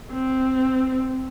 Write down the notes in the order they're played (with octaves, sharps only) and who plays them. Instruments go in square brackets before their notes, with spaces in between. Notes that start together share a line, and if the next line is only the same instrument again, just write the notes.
[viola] C4